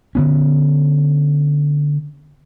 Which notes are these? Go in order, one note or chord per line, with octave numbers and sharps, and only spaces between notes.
D3 B3 C#4